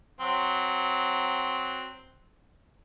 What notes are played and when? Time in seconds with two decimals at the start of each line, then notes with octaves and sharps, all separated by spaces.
0.21 F#3 C4